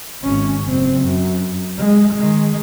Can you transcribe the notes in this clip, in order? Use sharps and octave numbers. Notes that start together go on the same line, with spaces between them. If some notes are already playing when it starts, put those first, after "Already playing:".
G#1 C#4
F#1 C4
F#2
G#3
D#3 G#3